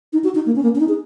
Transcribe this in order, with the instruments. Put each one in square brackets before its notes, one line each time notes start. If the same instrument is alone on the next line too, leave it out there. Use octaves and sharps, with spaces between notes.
[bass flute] D#4
F#4
D#4
A#3
C#4
A#3
C#4
D#4
G#4